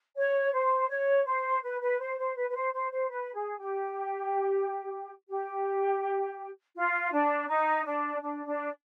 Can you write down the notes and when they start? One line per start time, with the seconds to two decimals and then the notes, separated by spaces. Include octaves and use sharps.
0.16 C#5
0.53 C5
0.89 C#5
1.25 C5
1.63 B4
1.81 B4
1.99 C5
2.18 C5
2.36 B4
2.49 B4
2.54 C5
2.73 C5
2.91 C5
3.09 B4
3.34 G#4
3.58 G4
5.28 G4
6.75 F4
7.12 D4
7.48 D#4
7.85 D4
8.21 D4
8.46 D4